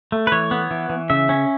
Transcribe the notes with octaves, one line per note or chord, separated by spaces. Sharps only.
A3
B4
E3 C#5
B3
E3
E3
C#3 E5
C#4